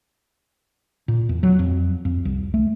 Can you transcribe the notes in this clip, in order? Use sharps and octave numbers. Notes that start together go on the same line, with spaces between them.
A#2
E2
F#3
F2
F2
C2
A3